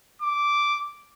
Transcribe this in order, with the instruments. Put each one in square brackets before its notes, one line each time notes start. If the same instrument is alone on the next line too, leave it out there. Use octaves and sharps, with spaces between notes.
[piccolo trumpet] D6